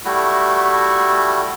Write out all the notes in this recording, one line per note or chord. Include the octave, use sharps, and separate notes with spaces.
G3 A3 E4 F#4